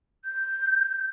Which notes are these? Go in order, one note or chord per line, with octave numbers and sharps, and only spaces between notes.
G6